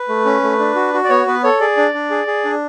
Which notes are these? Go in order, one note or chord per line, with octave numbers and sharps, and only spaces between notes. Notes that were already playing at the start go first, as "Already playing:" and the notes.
Already playing: B4
A3
C#4
A3
D4
F#4
F#4
D5
B3 C#5
B3 B4
A4 C#5
G#4 D5
D4
D4
G#4
G#4
D4